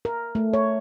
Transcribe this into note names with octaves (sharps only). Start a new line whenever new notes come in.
A#4
A3
C#5